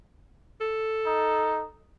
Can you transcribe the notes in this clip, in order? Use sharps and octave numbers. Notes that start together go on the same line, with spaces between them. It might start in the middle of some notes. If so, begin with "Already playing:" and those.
A4
D#4